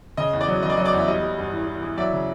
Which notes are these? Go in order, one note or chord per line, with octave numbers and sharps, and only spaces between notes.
C#3 D#5
E2
D5
F#3
C#3 D#5
D5
F#3 D#5
D5
E2
E5
G3 D#5
G3
G2
E3
E3
E3
F#3 D5 E5
C#3